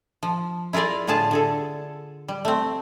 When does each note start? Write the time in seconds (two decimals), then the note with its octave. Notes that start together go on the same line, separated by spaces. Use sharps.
0.23 F3
0.73 E4 F4 G#4 A#4 D5
1.07 A2 D3 F4 G#4 A5
1.31 D3 G#4 A4
2.28 G3
2.45 A3 C4